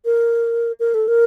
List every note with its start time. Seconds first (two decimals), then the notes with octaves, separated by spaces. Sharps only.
0.05 A#4
0.80 A#4
0.94 A4
1.08 A#4